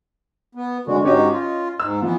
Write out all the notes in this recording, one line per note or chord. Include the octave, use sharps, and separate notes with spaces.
B3
F#2 D3 G#3 D4 F#4
G#2 C#4 F#4 G4 C#5 D#5
F4
G#2 E6
E3 F3 B3